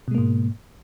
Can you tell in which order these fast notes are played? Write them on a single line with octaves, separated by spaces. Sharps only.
B2 G#3 A#3 G#2